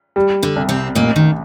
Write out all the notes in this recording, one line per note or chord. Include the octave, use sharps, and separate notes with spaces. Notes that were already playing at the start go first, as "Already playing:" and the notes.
G3
D3 D4
C2
C3 C4
A1 A#2 A#3
D#3